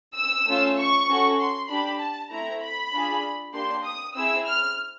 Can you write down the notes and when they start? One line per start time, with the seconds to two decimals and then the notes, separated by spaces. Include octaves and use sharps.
0.17 E6
0.46 A3 C#4 F4
0.78 C#6
1.08 C#4 F#4 A4
1.39 C6
1.69 D4 G4 B5
1.99 A5
2.30 A3 C4 E4 A#5
2.61 B5
2.92 D4 F4 G#4
3.53 A#3 D4 G4 C6
3.84 D#6
4.14 C4 E4 G#4 E6
4.45 F6